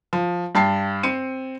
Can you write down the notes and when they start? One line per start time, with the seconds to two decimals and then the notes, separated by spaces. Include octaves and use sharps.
0.13 F3
0.55 G2 G5 A5 C7
1.03 C4 C#7 D#7